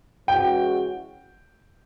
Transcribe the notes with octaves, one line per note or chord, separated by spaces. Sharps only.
E3 G#3 C#4 F#4 G5